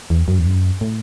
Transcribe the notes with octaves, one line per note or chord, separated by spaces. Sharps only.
E2
F#2
E2
F#2
A2